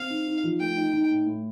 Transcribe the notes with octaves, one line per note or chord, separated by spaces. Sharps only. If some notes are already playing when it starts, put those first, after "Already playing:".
Already playing: C4 F5
D#4
D#4
F3
A3 G5
D#4
D#4
A2
A2